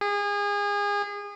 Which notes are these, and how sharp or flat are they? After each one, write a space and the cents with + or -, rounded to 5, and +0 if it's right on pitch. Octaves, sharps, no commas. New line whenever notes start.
G#4 -30